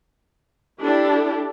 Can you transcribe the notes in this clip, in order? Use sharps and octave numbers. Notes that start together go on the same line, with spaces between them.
D4 E4 G4 A4